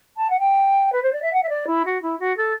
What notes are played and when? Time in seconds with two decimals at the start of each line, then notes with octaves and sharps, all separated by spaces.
0.16 A5
0.29 F#5
0.39 G5
0.92 B4
1.02 C5
1.12 D5
1.21 E5
1.32 F#5
1.42 E5
1.49 D5
1.66 E4
1.85 F#4
2.02 E4
2.19 F#4
2.36 A4